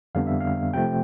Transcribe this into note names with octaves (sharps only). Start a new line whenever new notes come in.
F2 D3 G3 B3 D4 F5
E5
F5
C3 F3 A3 G5